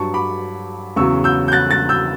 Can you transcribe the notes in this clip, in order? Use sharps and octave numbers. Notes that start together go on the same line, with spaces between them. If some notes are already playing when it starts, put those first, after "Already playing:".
Already playing: G2 F#3 A5 C#6
B5 D6
E2 C#3 F#3 C#6 E6
E6 G6
G6
F#6 A6
F#6 A6
E6 G6